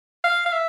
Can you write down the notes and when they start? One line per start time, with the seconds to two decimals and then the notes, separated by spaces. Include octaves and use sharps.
0.24 F5
0.46 F5
0.53 E5